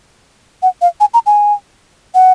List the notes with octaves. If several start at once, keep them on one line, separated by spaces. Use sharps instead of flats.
F#5
F5
G#5
A#5
G#5
F#5